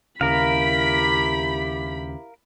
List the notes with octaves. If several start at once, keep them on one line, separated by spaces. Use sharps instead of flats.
D#2 C#3 E4 G4 A#4 F5 B5 B6